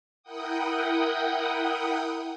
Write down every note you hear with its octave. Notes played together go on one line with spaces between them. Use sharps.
E4 A#4 F#5 G5 D#6